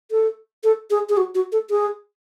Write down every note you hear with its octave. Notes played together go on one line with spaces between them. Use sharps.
A4
A4
G#4
G#4
F#4
F#4
A4
G#4